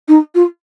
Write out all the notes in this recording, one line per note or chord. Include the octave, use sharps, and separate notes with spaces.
D#4
F4